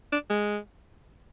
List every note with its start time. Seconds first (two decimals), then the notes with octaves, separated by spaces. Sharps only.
0.12 D4
0.30 G#3